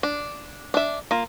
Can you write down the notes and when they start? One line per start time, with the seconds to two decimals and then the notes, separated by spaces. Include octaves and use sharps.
0.03 D4
0.74 D4 E5
1.11 A#3 F4